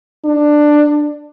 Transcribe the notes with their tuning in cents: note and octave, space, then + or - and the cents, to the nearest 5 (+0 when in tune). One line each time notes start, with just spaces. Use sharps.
D4 +15